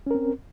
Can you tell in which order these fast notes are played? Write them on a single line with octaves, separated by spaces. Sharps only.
C#4 A#4 C4